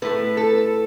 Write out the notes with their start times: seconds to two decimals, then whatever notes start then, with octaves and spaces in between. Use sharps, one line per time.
0.02 A2 A3 B4
0.37 A4